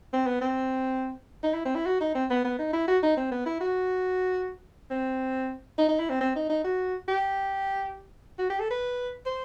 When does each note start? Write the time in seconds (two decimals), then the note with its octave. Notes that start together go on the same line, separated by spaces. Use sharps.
0.13 C4
0.26 B3
0.41 C4
1.43 D#4
1.54 E4
1.65 C4
1.75 E4
1.86 F#4
2.00 D#4
2.15 C4
2.30 B3
2.44 B3
2.59 D#4
2.73 E4
2.88 F#4
3.02 D#4
3.17 C4
3.31 B3
3.46 E4
3.60 F#4
4.91 C4
5.78 D#4
5.88 D#4
5.99 E4
6.09 C4
6.21 C4
6.36 D#4
6.50 D#4
6.64 F#4
7.08 G4
8.39 F#4
8.50 G4
8.59 A4
8.71 B4
9.26 C5